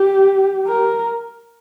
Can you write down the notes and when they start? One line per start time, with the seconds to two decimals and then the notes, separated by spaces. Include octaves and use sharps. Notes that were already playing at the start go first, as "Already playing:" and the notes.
Already playing: G4
0.68 A#4